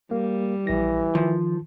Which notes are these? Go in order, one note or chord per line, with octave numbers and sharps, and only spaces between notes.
G3 A#3
A#1 E3 A#6
D#3 F3